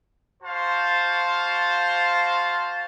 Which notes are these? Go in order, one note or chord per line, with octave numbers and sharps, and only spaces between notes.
F#4 C5 F5 A5 C6